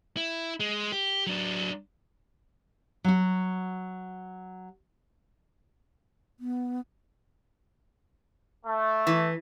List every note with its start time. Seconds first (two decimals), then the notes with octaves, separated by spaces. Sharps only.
0.17 E4
0.60 G#3
0.92 G4
1.27 F#3 D4
3.04 F#3 F#4
6.40 B3
8.66 A3
9.07 E3